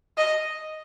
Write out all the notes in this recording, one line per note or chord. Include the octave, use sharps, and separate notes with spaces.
D#5